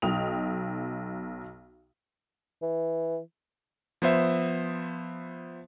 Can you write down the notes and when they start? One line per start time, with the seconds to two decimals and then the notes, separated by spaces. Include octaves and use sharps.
0.02 B1 D#4 G5 D#6 F7
2.62 E3
4.02 F3 B3 C5 E5